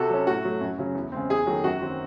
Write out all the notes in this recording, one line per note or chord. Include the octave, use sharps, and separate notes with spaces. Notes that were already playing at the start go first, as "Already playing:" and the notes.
Already playing: C3 F#4 A4
F#3 C#4
A2 F#4
F#3 A3
F#2
C#3 F#3
E2
C#3 G#3 C4
E2 G#4
D#3 F#3 A3
F#2 F#4
D#3 F#3 C4